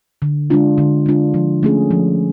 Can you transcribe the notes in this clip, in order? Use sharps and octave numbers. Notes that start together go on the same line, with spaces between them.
D3
G#3 D4 F4
D3
G#3 D4 F4
F3
A3 C#4 G#4
F3